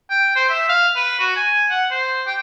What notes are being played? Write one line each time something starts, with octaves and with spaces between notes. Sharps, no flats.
G5
C5
E5
F5
B4
F#4
G#5
F#5
C5
G5